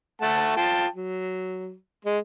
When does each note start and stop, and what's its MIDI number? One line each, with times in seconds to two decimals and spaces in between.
0.22 0.54 57
0.22 0.54 78
0.22 0.54 81
0.57 0.87 65
0.57 0.87 79
0.57 0.87 81
0.94 1.75 54
2.05 2.18 56